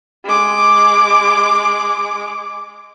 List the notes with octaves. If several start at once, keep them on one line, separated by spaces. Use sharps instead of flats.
G#3 D6